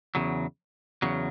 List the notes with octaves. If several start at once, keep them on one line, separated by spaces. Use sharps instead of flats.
E2 C#3 F#3
E2 C#3 F#3